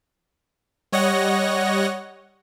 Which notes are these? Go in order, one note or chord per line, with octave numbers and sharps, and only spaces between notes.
G3 C#5 D#5 F#5 A#6